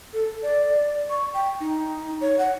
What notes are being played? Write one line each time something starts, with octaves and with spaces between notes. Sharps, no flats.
A4
D5
C#6
G5
D#4
C#5
F#5